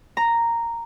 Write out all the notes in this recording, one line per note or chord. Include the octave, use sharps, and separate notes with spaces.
A#5